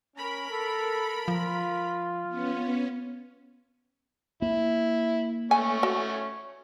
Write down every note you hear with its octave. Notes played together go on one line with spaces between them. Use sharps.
C#4 A#4 B5
A4
F3 F4
B3 C#4
A#3 E4
A3 C#4 G#5
F#4